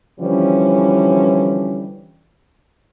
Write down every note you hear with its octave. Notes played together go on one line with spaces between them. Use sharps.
D3 E3 F3 G3 C#4